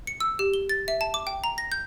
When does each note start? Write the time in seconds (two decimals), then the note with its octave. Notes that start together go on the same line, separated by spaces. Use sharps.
0.07 C#7
0.20 E6
0.39 G4
0.54 G7
0.69 A6
0.88 E5
1.01 A5
1.14 D6
1.27 G5
1.44 A#5
1.58 A#6
1.72 G6